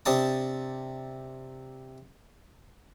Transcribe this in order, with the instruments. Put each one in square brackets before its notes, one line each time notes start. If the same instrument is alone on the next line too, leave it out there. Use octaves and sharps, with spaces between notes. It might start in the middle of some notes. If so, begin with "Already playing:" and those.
[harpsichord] C3 D4 A5 D#6